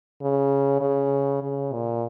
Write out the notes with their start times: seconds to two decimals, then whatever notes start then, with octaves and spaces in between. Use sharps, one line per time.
0.22 C#3
0.81 C#3
1.42 C#3
1.73 A#2